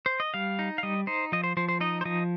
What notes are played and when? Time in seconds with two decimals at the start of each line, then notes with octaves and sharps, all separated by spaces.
0.06 C5
0.20 D#5
0.34 G3 F5
0.59 D#4
0.78 F5
0.83 G3 D#5
1.07 D#4 C5
1.32 F3 D#5
1.44 C5
1.57 F3 C5
1.69 C5
1.81 D#4 D#5
2.01 C5
2.05 F3 D#5